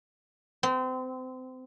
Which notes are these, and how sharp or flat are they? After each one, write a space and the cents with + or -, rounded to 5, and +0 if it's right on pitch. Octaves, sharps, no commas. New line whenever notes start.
C4 -30